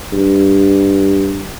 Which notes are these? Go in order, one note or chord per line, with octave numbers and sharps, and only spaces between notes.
G2